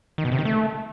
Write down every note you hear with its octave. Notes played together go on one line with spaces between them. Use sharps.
D#3
B2
C3
D#3
A3